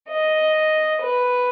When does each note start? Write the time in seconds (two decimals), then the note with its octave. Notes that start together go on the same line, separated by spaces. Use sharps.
0.09 D#5
1.02 B4